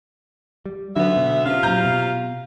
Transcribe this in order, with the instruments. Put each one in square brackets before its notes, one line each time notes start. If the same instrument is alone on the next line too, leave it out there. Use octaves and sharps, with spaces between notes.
[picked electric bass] G3
[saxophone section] D2 B3 E5 [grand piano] D3 [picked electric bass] F#3
[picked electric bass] B2
[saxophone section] C3 F4 F5 [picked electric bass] C#4
[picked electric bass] A#2 F#3 [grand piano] A#5 F6 G6
[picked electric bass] B2